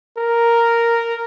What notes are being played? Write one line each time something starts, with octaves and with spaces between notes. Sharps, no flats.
A#4